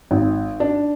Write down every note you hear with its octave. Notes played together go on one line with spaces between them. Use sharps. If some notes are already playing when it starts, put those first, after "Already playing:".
G#1
D4